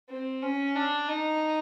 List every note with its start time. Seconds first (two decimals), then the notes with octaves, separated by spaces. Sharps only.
0.10 C4
0.43 C#4
0.76 D4
1.09 D#4